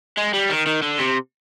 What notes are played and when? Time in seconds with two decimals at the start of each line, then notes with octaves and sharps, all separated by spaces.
0.17 G#3
0.34 G3
0.50 D#3
0.67 D#3
0.82 D3
0.99 C3